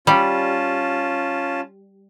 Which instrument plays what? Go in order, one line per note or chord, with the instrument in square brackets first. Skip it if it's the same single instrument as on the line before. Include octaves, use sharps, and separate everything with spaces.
[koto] G3 [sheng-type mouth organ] C#4 F4 A5